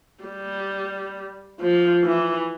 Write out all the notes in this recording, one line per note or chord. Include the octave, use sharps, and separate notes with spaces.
G3
F3
E3